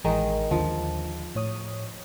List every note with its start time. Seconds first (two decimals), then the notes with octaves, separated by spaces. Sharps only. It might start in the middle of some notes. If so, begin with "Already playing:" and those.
0.04 A1 D#3 E3 G#3 D#4
0.51 D#2 D3 F3
1.35 A2 C#5 D#6